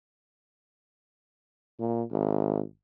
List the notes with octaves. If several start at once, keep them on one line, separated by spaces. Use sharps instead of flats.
A#2
G#1